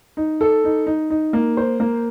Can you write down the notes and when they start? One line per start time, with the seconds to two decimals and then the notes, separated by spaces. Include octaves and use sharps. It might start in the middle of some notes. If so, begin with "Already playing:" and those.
0.17 D#4
0.41 A4
0.65 D#4
0.87 D#4
1.10 D#4
1.33 A#3
1.57 C5
1.80 A#3